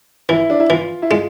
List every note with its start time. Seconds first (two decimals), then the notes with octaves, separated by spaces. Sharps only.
0.29 E3 E4
0.50 D4
0.60 E4
0.70 E3 F4
1.02 E4
1.10 G#3 F4